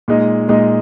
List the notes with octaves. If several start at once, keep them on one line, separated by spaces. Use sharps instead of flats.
A#2 G#3 D#4
A#2 G#3 D#4